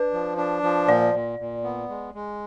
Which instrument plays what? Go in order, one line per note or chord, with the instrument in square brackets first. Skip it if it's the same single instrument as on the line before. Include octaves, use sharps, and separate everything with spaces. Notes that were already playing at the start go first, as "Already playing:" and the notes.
Already playing: [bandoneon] D4 [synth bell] B4
[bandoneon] F3
D4
F3
[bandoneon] A#2 [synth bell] D5
[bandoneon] A#2
A#2
B3
G#3
G#3